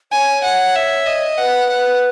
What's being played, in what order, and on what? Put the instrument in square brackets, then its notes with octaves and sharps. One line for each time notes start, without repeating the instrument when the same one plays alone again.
[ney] C#5 [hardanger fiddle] G#5
[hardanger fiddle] F#5
E5
D#5
[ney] B4 [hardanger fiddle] F#5
[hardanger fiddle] F#5